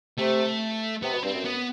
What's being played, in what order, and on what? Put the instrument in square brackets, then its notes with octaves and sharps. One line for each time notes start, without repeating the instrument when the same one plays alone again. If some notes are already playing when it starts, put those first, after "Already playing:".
[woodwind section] C3 [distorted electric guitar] A3
[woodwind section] C3 [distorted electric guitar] B3
[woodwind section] B2
[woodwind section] G2 [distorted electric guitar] C4
[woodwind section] F#2
[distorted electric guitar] B3